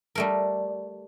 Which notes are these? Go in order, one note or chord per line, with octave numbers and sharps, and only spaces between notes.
G3 A3 A#4